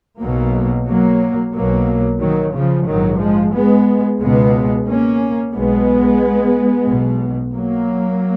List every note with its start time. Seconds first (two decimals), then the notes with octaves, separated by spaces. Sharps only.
0.21 B1 B2 F#3 A#3
0.87 F#3 A#3
1.54 B1 B2 F#3 A#3
2.21 D#3 F#3
2.54 C#3 F3
2.87 A#1 G#2 D#3 F#3
3.20 F3 G#3
3.54 G#3 B3
4.21 C#2 B2 G#3 B3
4.87 A#3 C#4
5.54 B1 B2 G#3 B3
6.87 B1 B2
7.53 F#3 A#3